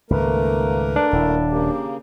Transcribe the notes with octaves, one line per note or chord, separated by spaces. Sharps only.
C#2 G#2 D#3 A3 A#3 A#4 B4
D4
D#1 E4
C#3 A#3 G4